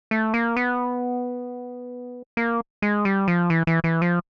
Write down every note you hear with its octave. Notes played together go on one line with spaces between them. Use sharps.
A3
A#3
B3
A#3
G#3
G3
F3
E3
E3
E3
F3